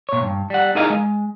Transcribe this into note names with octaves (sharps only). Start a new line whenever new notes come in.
A#2 C#5
G2
G3 F#5
D#4 E4 G#4 A#4 D#5 F5
G#3